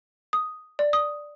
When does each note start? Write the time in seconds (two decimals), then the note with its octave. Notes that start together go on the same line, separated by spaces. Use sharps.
0.33 D#6
0.79 D5
0.93 D#6